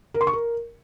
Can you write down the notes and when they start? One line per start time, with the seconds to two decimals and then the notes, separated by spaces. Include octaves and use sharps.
0.14 A#4
0.21 C6
0.27 C#6
0.33 A#4